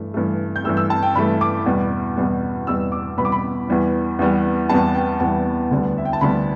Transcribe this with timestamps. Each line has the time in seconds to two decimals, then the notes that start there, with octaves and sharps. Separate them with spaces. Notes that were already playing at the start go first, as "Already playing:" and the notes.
Already playing: G2 E3 A3
0.14 G2 E3 A3
0.56 G6
0.64 G2 E3 A3 E6
0.77 E6
0.90 A5
1.03 G5
1.15 G2 E3 A3 B5
1.41 D6
1.66 E2 B2 G3 B3
2.16 E2 B2 G3 B3
2.67 E2 B2 G3 B3 E6
2.92 D6
3.17 E2 B2 G3 B3 B5
3.25 D6
3.32 B5
3.69 E2 E3 G3 B3
4.19 E2 E3 G3 B3
4.69 E2 E3 G3 B3 A5
4.94 G5
5.20 E2 E3 G3 B3 A5
5.71 D2 D3 G3 B3
5.98 E5
6.05 G5
6.13 A5
6.21 D2 D3 G3 B3 B5